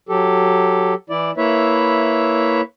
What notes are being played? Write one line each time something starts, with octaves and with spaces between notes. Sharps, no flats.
F#3 G4 A4
E3 E4 D5
A#3 E4 B4 C#5 E5